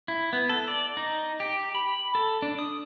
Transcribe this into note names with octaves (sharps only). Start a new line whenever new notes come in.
E4
B3
A4
D5
D#4
G4
B5
A4
D4
D#6